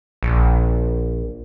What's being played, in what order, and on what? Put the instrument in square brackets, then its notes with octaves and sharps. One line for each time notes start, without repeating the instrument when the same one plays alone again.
[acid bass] A#1